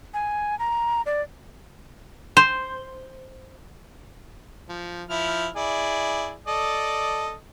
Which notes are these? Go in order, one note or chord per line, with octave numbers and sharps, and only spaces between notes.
G#5
A#5
D5
C5
F3
F3 E4 F6
E4 G#4 D5
A4 D5 D#5